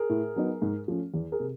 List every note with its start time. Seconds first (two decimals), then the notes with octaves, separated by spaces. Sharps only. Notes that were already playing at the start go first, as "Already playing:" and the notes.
Already playing: G#4 A#4
0.10 A2
0.36 F#3 B3 D#4
0.62 G#2
0.88 F3 A3 C#4
1.14 E2
1.32 G#4 A#4
1.40 C3